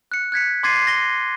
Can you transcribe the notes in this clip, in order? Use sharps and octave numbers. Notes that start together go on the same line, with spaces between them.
F#6 C#7
F#6 G#6 B6 C#7
C6 D6 G#6 A6 C7 D#7
A#6 G7